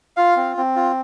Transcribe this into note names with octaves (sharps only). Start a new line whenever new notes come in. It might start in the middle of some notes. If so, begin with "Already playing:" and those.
F4 F5
C4
C4
F4